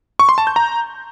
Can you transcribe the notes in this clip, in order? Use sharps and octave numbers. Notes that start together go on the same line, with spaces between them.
C#6
C6
A5
G6
A#5